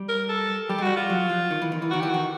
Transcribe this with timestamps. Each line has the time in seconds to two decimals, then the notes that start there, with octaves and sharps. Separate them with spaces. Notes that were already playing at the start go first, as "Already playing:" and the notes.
Already playing: G3
0.09 A#4
0.29 A4
0.69 G3 G4
0.78 G#3
0.82 G3 F#4
0.96 F4
1.10 F#3
1.30 F3
1.51 D#3
1.62 E3
1.72 D#3
1.82 E3
1.91 D#3 F#4
2.00 E3 G4
2.10 D#3 F#4